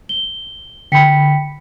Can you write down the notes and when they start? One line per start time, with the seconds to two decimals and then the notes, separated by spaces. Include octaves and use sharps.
0.09 G7
0.92 D3 G5 B5 B6 C#7